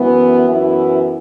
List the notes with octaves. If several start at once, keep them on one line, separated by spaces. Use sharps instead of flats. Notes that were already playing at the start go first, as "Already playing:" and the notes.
Already playing: F#2 E3 B3
F#2 E3 B3 E4